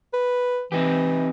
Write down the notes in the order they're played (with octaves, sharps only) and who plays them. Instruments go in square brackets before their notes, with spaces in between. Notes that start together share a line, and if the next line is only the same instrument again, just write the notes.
[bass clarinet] B4
[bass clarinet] E3 [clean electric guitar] C4 D#4 G4